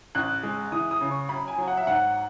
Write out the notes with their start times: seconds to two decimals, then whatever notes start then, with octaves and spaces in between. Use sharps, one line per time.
0.15 A1 F#6
0.43 G#3
0.72 E3 D#6
0.91 D#6
1.01 C#3
1.11 C#6
1.29 F#2 B5
1.48 G#5
1.58 F#3
1.68 F#5
1.77 E5
1.87 G#2 F#5